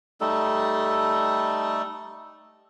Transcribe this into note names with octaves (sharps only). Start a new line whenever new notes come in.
G3 A3 D#4 A4